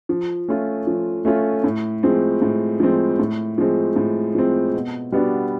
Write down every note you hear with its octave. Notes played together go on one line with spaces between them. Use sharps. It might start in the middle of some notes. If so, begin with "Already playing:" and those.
F3
A3 C#4 F4
F3
A3 C#4 F4
A2
F3 G#3 C4
A2
F3 G#3 C4
A2
F3 G#3 C4
A2
F3 G#3 C4
B2
G3 B3 D4 F#4